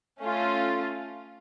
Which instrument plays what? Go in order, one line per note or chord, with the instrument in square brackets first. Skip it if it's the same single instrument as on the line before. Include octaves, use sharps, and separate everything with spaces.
[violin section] A3 C#4 F4